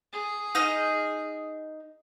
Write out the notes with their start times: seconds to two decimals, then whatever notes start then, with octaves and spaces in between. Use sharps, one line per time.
0.12 G#4
0.55 D#4 D#5 F6